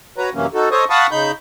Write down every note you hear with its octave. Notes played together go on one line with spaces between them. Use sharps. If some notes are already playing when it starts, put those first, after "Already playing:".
F#4 B4 C#5 A#5
F#2 C3 E3 F#3 A#3 C#4
D#4 F#4 A4
A4 C5 C#5 D#5 C#6 D#6
F5 F#5 A5 B5 C#6 D#6
C#3 D#4 B5 G6